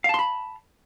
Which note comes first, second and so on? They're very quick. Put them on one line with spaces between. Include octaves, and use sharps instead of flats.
F5 A5 C6 B5